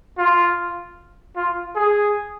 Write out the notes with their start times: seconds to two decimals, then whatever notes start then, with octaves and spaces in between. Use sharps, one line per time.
0.18 F4
1.36 F4
1.75 G#4